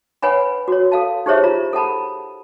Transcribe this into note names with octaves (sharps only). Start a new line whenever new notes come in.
B4 C#5 F#5 G#5 B5
F#4 C#5
A4 F5 A5
D#4 G4 G#4 C5 C#5 E5
F4 A#5
A4 F#5 A5 B5